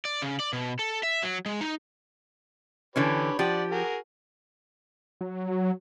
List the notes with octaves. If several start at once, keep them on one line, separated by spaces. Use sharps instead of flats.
D5
C#3
D5
B2
A4
E5
F#3
G#3
D#4
D3 E3 C#4 G4 B4 C#5
F3 G4 D5 F#5
F#4 G#4 A#4
F#3